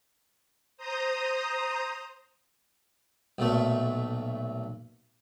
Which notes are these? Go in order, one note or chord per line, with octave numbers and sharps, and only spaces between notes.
C5 A#5 D#6
B1 A#2 A3